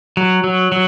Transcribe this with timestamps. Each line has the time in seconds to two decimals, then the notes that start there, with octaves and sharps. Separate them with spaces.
0.17 F#3
0.44 F#3
0.72 F#3